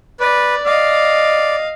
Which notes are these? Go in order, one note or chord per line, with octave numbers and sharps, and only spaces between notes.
B4 D5
D5 D#5 F5